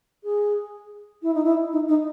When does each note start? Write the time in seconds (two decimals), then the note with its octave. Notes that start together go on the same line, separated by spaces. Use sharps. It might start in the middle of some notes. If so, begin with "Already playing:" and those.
0.23 G#4
1.22 E4
1.34 D#4
1.44 E4
1.72 D#4
1.88 D#4